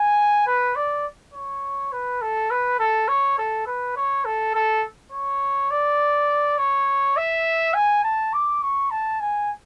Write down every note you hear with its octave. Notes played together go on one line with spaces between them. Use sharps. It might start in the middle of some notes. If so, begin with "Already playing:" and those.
Already playing: G#5
B4
D5
C#5
B4
A4
B4
A4
C#5
A4
B4
C#5
A4
A4
C#5
D5
C#5
E5
G#5
A5
D6
C#6
A5
G#5